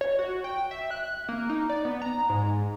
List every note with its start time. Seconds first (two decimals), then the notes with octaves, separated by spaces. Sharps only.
0.01 C#5
0.19 F#4
0.44 G5
0.71 E5
0.91 F#6
1.29 A#3
1.49 D#4
1.69 D5
1.85 B3
2.02 A#5
2.29 G#2